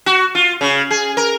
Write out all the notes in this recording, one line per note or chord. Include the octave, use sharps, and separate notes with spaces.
F#4
F4
C#3
G#4
A#4